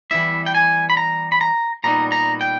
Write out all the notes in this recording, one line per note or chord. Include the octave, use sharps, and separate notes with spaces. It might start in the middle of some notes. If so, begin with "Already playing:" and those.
E3 G3 B3 E4 E5
G5
G#5
B5
A#5
B5
A#5
A#2 G3 B3 D#4 A#5
A#5
G5